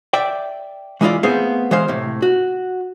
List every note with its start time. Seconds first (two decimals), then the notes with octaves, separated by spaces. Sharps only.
0.13 D5 E5 G5
1.01 E3 G#3 E4 F4 D5
1.23 A3 B3 C4 G#4 C5 F5
1.71 E3 G#3 C5 F5
1.88 A2 C3
2.22 F#4